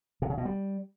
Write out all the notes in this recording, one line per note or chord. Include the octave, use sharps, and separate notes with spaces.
C3
C#3
B2
G3